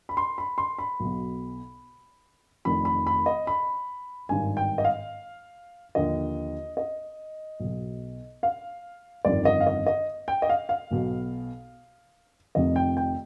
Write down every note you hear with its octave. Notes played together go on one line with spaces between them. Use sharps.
B5
C6
B5
C6
B5
B1 B2
F1 F2 D#3 B5
B5
B5
D#5
B5
G#1 G2 D#3 G#5
G5
D#5
F5
D#2 D3 F3 D#5
D#5
B1 B2
F5
G1 F2 D#3 D5
D#5
F5
D#5
D#5
G5
D#5
F5
F5
B1 B2
F1 F2 C3 D#3 D#5
G5
G5